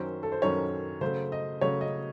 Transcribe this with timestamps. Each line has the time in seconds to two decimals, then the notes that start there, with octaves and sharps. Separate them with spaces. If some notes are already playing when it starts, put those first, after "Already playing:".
Already playing: F#2 D#3 F#3 C#4 C5
0.23 A4
0.32 C5
0.42 F#2 D#3 F#3 C#4 C#5
1.01 C#3 F#3 A3 C5
1.32 D#5
1.61 C#3 F#3 A3 C#5
1.81 D#5